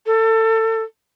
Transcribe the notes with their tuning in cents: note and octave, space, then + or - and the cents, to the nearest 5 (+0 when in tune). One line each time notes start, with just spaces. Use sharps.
A4 +25